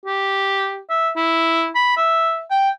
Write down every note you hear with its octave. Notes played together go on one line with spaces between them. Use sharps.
G4
E5
E4
B5
E5
G5